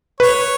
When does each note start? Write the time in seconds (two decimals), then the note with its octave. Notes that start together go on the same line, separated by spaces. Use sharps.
0.20 B4 C#5